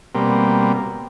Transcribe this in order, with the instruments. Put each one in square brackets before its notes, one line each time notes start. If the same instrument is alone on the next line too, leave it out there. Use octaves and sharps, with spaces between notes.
[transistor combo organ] B2 G3 A#3 C4